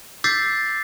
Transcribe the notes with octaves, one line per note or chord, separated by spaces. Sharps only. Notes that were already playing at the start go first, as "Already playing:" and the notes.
D6 E6 G6 A6 B6 C7